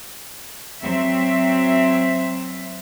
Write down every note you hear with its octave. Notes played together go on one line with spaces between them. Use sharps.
F#3 C4 E5